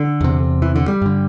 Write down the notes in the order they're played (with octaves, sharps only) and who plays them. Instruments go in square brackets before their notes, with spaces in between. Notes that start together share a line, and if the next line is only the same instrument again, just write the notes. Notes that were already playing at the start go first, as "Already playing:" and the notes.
Already playing: [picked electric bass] D3
E2 C3
E3
D3
G3
G2 D3